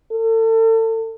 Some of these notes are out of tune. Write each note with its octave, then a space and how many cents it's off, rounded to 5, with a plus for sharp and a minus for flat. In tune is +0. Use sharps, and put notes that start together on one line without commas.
A4 +35